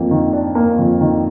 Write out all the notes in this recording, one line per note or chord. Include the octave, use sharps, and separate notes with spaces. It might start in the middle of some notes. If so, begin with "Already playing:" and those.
Already playing: F2 A#3
D#3
D4
A#3
F2
D#3